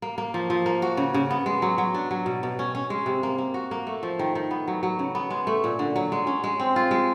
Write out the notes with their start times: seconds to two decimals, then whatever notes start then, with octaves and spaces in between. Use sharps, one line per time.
0.02 A#3
0.18 A#3
0.34 F3
0.50 F3
0.66 A#3
0.82 F#4
0.97 C#3
1.14 C#3
1.31 B3
1.46 G#3
1.62 F#3
1.78 F#3
1.94 D4
2.11 F#3
2.26 B2
2.43 B2
2.59 C#4
2.75 C#4
2.90 G#3
3.06 C3
3.23 A#3
3.38 A#3
3.54 F#4
3.71 A#3
3.87 A3
4.03 F3
4.19 D#3
4.35 D#3
4.51 B3
4.68 F#3
4.83 F#3
4.99 C#3
5.15 B3
5.30 G#3
5.47 A3
5.64 A#2
5.79 D3
5.96 F#3
6.12 G#3
6.27 C#4
6.44 G#3
6.60 C4
6.76 F4
6.91 G#3